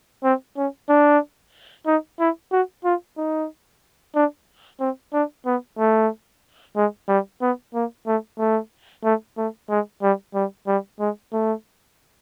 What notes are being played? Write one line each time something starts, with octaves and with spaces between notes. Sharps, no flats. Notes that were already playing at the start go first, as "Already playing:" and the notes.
C4
C#4
D4
D#4
E4
F#4
F4
D#4
D4
C4
D4
B3
A3
G#3
G3
B3
A#3
A3
A3
A3
A3
G#3
G3
G3
G3
G#3
A3